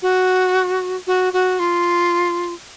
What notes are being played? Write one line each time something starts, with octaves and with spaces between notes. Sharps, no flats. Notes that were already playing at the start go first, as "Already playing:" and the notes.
F#4
F#4
F#4
F4